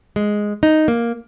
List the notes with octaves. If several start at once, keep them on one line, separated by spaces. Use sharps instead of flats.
G#3
D#4
A#3